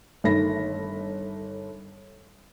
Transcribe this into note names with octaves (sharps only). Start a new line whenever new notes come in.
G1 D#3 A4 B5 A#6